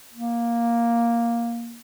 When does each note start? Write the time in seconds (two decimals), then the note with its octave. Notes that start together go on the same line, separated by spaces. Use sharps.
0.13 A#3